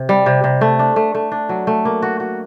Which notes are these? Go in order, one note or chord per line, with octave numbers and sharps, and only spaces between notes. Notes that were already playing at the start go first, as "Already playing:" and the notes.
Already playing: C3
G3
C3
C3
A3
D4
A3
A3
D4
F#3
A3
A#3
F#4
F#4